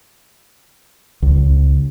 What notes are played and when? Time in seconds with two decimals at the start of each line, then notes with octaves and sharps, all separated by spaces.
1.22 C#2